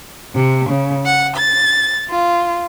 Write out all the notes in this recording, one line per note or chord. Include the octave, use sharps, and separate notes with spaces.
C3
C#3
F#5
A6
F4